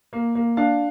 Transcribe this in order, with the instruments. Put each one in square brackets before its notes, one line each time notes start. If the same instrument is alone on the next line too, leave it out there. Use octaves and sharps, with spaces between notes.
[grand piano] A#3
A#3
D4 F5